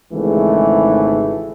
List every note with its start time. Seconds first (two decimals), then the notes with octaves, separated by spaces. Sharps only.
0.12 G#1 G#2 C#3 E3 A3